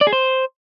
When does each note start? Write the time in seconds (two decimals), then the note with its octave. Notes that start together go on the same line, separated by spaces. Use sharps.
0.01 D5
0.07 G#4
0.13 C5